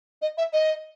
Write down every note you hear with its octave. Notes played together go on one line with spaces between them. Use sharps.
D#5
E5
D#5